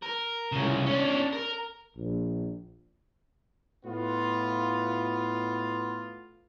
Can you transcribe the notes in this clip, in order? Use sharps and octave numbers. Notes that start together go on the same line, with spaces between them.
A#4
C2 C#3
C#4 D4
A#4
A#1
A2 B3 F4